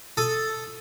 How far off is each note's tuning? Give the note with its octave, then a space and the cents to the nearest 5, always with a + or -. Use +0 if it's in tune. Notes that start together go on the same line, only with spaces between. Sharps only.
A4 +0 D#6 +0